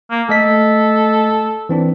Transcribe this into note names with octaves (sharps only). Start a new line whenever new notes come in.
A#3
A3 A4 D#5 B6
E3 C4 D4